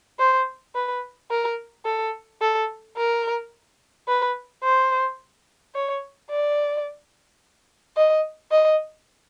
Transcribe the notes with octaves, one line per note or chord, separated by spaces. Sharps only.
C5
B4
A#4
A4
A4
A#4
B4
C5
C#5
D5
D#5
D#5